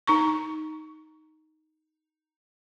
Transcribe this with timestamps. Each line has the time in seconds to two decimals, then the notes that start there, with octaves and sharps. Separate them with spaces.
0.07 D#4 A#5 C#6